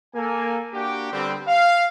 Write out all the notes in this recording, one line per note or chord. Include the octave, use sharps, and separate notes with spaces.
A#3 A4 G#5
A#3 D4 F#4 G4
D3 G3 B3 C4
F5